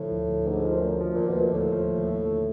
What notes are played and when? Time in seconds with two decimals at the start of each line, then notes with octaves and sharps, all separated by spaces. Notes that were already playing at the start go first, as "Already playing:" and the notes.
Already playing: A2 D3 F3
0.11 D2
0.29 D2
0.46 G#2 D3
0.65 F3
0.74 F#2
0.82 D2
1.00 F3
1.14 D#2 A#2
1.27 B2
1.36 A#2 A3
1.53 A2 D3
1.72 F3
1.89 D#2
2.08 A3
2.26 D3